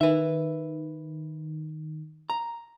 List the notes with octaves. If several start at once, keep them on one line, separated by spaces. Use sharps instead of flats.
D#3 B4 E5
A#5